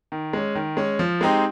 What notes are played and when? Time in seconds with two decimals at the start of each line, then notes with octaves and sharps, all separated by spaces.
0.12 D#3
0.33 G#3 C#4
0.55 D#3
0.77 G#3 C#4
0.99 F3
1.21 G#3 C4 D#4 G4